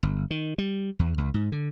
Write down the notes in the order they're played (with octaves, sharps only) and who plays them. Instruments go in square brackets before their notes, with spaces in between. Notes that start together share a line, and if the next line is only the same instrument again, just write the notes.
[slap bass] G1
D#3
G3
E2
C#2
G#2
D3